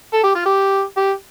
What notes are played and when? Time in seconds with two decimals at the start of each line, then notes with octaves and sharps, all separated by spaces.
0.13 A4
0.24 G4
0.35 F4
0.46 G4
0.97 G4